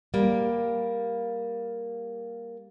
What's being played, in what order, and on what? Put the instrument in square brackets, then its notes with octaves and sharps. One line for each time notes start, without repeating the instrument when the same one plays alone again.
[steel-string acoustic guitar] G3 A#3